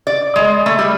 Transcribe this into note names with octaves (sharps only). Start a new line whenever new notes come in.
D5
G#3
A3
G3